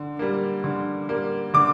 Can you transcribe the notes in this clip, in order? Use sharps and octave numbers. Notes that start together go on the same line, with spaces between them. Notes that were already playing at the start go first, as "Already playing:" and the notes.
Already playing: D3
G3 A#3
D3
G3 A#3
D3 D6